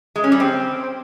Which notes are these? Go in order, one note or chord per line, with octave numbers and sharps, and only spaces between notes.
G#3
C#4
G3
C4